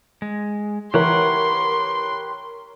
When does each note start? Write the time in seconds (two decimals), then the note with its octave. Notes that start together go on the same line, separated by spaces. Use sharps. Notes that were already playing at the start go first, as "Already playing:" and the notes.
0.22 G#3
0.94 E3 G4 A#4 B4 C#5 F#5 C6